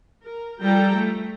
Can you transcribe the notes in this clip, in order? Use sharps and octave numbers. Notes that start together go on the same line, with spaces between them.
A#4
F3 G3 A4 G5 A#5
A3